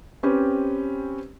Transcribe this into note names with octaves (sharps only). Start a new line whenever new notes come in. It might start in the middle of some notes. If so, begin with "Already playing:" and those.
C4 C#4 G4 B4